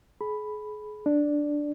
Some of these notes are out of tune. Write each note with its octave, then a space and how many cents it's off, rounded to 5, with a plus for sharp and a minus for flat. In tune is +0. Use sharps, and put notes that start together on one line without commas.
G#4 +35 B5 +0
D4 +0 D5 +0